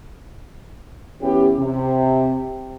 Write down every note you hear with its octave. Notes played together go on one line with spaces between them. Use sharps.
E3 B3 C#4 G4
C3